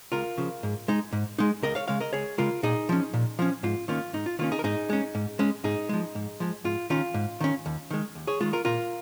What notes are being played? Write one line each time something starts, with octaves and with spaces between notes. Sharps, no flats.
C#2 F4 A#4
C#3 F3
G#2
G#3 D#4
G#2
G#3 D#4
C#2 A#4 D#5
C#5 F5
C#3 G#3 C#5 F5
A#4 D#5
C#2 G#4 C#5
C#3 G#3 F4 A#4
A#2 D#4 G#4
F3 C#4
A#2
F3 C#4
G#2 F4
D#3 A#3 C#4 F4
G#2 D#4
F4
D#3 A#3 C#4 F4
D#4 G#4
A#4
G#2 D#4 G#4
G#3 C#4
G#2
G#3 C#4
G#2 D#4 G#4
F3 G#3
G#2
F3 G#3
G#2 F4
D#3 C#4 F4
G#2
D#3 C#4
D#2
D#3 G#3
D#2
G#4 C#5
D#3 G#3 F4
F4 A#4
A#2 F4 A#4